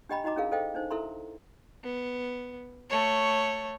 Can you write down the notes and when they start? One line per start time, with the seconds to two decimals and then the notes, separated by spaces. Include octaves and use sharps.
0.09 D4 G4 D#5 G5 A#5 B5
0.24 D#4 F#4 D#5 A#5 D6
0.36 C#4 E4 G#4 A#4 F5
0.52 A4 C5 D#5 F5 G5
0.75 D4 D#4 C5
0.91 E4 A4 A#4 E5 A#5 C6
1.84 B3
2.89 A3 C#5